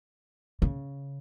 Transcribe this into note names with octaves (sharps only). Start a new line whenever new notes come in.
C#3